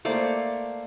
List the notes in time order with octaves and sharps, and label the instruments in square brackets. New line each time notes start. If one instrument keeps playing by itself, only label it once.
[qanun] A3 A#3 C5 D5